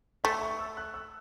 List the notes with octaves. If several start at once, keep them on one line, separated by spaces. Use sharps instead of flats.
A3 E5
C#6
E6
F#6
E6